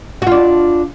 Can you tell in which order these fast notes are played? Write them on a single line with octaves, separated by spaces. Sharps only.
F#4 F4 D4